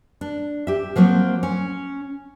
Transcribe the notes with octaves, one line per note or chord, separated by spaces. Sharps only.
D4
G4 E5
F3 F#3 A#3 C4
C#4